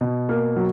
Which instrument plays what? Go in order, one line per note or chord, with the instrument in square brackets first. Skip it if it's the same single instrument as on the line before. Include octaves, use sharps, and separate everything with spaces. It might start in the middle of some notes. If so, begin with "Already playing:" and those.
[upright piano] B2
A#3
F#3